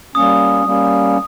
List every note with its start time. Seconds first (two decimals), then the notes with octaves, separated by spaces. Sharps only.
0.15 G3 A#3 C#4 D#6
0.66 G3 A#3 C#4